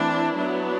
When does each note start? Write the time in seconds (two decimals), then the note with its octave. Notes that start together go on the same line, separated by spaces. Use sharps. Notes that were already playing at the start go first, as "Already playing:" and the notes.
Already playing: E3 A3 C4 D4 E4
0.36 F#3 B3 D4